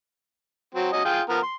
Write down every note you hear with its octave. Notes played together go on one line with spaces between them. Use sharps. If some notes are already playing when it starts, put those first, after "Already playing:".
F#3 C4
F#3 C#4 D#5
F4 G#4 G5
F3 B3 A#4
C6